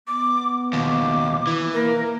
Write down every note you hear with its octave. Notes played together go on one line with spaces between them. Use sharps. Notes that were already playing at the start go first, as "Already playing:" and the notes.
B3 D6
D#2 B2 D6
E3
A#3 A#4